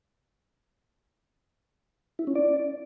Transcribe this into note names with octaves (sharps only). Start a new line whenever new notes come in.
E4
C#4
D5